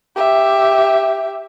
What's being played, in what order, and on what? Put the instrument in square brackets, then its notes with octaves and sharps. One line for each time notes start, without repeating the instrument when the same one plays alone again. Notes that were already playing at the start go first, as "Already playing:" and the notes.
[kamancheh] G4 E5